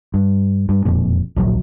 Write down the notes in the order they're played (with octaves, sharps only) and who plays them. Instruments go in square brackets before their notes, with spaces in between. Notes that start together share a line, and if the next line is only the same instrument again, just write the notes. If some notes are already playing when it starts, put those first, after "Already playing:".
[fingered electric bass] G2
G2
E1 F2 A#2
D1 A#1 F#3